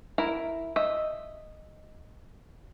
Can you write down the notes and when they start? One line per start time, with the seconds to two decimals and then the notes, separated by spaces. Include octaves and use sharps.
0.18 E4 A#4
0.76 D#5 E5